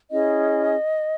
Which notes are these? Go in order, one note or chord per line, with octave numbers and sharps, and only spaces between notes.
C#4 E4 G#4 D#5